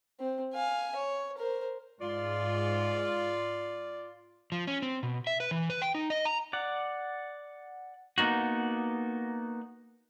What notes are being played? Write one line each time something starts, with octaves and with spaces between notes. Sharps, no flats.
C4
F5 G#5
C#5
A#4 C5
G#2 F4 D5
F3
C#4
C4
B2
E5
B4
E3
B4
G5
D#4
D#5
A#5
D5 F#5
A#3 B3 D#4 F#4